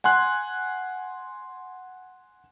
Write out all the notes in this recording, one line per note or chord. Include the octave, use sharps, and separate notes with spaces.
F#5 G#5 C6 F#6